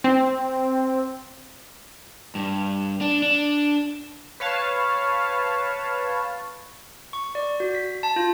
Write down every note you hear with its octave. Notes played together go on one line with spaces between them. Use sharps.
C4
G2
D4
D4
B4 C#5 F5 A5
C#6
D5
F#4
B6
A5
F4